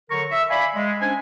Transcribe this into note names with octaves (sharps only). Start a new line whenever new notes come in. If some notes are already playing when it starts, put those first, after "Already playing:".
D3 F#3 A#4 A#5 C#6
E5
D5 F5 G#5 B5
G#3
C#4 D4 C5 G#5